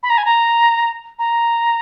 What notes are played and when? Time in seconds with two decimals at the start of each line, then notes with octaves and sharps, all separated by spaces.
0.03 B5
0.10 A#5
0.18 G#5
0.25 A#5
1.19 A#5